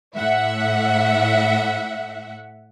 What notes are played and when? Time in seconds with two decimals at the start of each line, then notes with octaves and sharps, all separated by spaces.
0.15 A2 E5 F#5